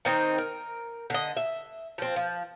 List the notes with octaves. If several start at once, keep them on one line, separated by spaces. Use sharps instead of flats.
D#3 C4 D#4
A#4
D3 D#5
E5
F3 C4
F3